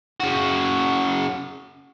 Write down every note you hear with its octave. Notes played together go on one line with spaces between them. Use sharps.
C#3 F#4